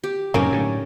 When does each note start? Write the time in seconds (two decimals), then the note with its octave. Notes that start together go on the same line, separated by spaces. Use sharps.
0.04 G4
0.34 F#2 A2 C3 A#3 C#4 D#4 A#4
0.52 A2 D3